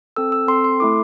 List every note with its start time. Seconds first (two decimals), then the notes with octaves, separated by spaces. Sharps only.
0.16 C4 A4 E6
0.32 E6
0.48 C4 A4 C6
0.64 C6
0.80 A3 E4 A4 D6